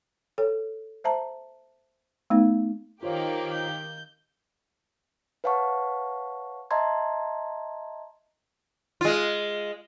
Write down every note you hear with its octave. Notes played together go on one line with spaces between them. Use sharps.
A4 C#5
C5 E5 A5 A#5
A3 B3 D#4
D#3 A#3 F4 G4 C5 C#5 F5
G6
B4 C#5 F5 F#5 A5 C#6
D#5 E5 A5 A#5 C6 G#6
G#3 F4